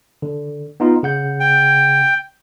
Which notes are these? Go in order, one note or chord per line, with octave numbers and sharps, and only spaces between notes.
D3
B3 D#4 F4
C#3 F#5 G6
G5